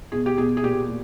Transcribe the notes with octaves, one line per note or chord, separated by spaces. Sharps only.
B2 G#4
G4
B2 G#4
G#4
A#2 G4
A#2